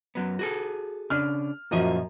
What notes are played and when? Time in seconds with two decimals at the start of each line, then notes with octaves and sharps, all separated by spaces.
0.15 F#2 F#3 B3
0.39 F#4 G#4 A4
1.10 C#3 D4 F6
1.71 F#2 A#2 F3 F#3 D#5 E5